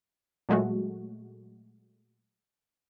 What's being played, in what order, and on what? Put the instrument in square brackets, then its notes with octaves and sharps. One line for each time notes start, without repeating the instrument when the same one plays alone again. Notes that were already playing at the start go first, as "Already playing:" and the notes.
[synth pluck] A#2 F#3 G#3 A3 F#4